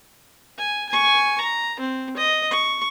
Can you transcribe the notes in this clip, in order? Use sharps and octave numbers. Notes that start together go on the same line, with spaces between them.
G#5
G#5 C#6
A#5
C4
D#5
C#6